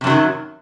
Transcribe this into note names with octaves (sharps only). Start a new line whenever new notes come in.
F#2 C3 D#3 F#3